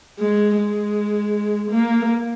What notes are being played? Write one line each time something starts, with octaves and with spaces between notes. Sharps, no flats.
G#3
G#3
A#3